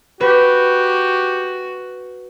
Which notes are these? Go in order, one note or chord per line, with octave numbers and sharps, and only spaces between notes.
F#4 G4 B4